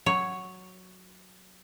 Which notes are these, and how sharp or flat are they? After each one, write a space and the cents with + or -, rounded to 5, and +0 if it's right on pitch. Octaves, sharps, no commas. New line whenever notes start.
F#3 +0 C#5 +0